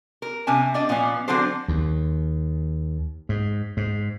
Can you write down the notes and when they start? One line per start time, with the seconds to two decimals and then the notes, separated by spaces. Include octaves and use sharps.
0.22 A#4
0.47 C3 C#4 G#5 A5
0.74 D4 D5 D#5
0.89 A#2 F3 B3 C#4
1.28 D3 F#3 C4 D4 A4 C5
1.68 D#2
3.29 G#2
3.77 G#2